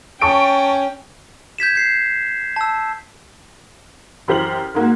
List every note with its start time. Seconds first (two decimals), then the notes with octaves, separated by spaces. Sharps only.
0.21 C#4 G5 A5 C#6 D7
1.58 G6 G#6 B6 E7
1.75 G6 C7
2.56 A5 E6
4.28 F#2 E3 G4 C5 F6 F#7
4.75 G#2 A#3 F#4